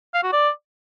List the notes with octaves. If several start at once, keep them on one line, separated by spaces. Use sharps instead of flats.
F5
F#4
D5